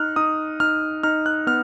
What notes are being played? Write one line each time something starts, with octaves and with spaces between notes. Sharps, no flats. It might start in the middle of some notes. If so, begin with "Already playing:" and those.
Already playing: D#4 F6 F#6
D#4 D#6
D#4 F6
D#4 F6
F#6
B3 F6